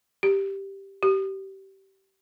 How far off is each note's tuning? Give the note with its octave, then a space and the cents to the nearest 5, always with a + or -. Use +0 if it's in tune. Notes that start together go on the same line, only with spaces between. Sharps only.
G4 +0
G4 -25